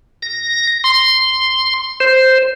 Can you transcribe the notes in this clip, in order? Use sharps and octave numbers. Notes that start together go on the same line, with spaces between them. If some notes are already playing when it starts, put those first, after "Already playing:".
A#6
C6
C5